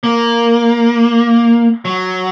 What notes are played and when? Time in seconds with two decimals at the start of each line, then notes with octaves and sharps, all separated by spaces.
0.04 A#3
1.85 F#3